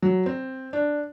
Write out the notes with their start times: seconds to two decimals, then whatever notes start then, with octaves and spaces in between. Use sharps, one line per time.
0.02 F#3
0.26 C4
0.73 D4